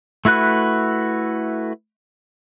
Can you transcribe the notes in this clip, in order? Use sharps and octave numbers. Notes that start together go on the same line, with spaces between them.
A3 E4 F#4 B4 F#6